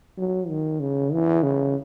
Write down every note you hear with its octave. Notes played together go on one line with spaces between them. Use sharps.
F#3
D#3
C#3
E3
C#3